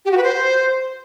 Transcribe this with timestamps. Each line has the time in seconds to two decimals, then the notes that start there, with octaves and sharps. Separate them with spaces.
0.05 G4
0.11 F#4
0.17 B4
0.23 C5